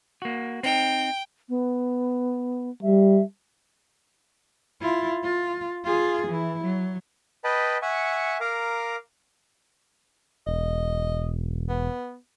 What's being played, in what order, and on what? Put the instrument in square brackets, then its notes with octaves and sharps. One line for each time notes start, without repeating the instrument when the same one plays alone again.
[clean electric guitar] A#3 F#4
[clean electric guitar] C4 D#4 [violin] G5
[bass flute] B3
[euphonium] G3 [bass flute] E5
[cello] E4 F4
F4
F4 G#4
E3 E4
F#3
[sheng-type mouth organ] B4 D#5 G5 A5 B5
E5 F#5 G#5 C#6
A#4 F5 A#5 D6
[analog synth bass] E1 [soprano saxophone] D#5
[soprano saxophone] B3